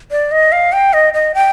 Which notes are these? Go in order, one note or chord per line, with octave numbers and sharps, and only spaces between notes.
D5
D#5
F5
G5
D#5
D#5
G5